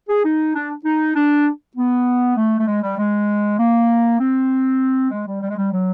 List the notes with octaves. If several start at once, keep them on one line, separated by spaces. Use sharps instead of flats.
G#4
D#4
D4
D#4
D4
B3
A3
A3
G#3
G3
G#3
A#3
C4
G#3
G3
G3
G#3
G3
F#3